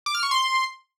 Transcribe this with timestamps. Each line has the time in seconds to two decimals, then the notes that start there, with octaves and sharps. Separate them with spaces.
0.06 D6
0.15 F6
0.23 C#6
0.31 C6